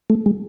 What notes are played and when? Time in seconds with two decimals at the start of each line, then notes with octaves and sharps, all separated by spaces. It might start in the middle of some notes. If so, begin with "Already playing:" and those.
0.10 A3
0.26 G#3